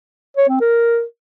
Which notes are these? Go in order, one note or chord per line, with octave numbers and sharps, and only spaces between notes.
C#5
C4
A#4